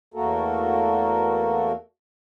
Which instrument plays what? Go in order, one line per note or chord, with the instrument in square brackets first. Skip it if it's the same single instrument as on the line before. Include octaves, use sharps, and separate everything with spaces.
[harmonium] E2 A3 A#3 F#4 A4 A#4